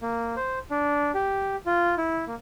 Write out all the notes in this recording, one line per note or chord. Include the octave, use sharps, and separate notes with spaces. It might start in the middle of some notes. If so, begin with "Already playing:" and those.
A#3
C5
D4
G4
F4
E4
A#3